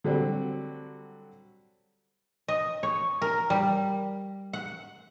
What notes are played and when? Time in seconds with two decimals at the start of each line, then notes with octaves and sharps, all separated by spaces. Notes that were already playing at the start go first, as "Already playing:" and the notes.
0.04 D3 F#3 G3 C4 F#4
2.48 D#5
2.83 C#5
3.22 A#4
3.50 G3
4.53 F#5